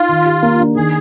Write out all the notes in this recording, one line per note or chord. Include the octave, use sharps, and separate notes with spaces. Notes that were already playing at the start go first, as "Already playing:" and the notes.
Already playing: D#4 F4
D#3
G4
A#3
D4
D#3 G#4